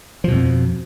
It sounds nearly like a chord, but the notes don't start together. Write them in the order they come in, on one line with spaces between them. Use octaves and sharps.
F3 B2 F2